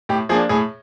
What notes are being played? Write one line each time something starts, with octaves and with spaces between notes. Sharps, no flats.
A2 G4
F3 A#3 D4 G#4
A2 G#4